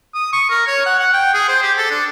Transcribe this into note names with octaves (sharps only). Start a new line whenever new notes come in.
D#6
C#6
A#4
C#5
F#5
F#5
G5
G#4
C5
G4
A4
D4